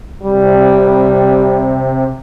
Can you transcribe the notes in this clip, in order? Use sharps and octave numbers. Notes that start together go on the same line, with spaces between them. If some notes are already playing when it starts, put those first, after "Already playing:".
C3 G3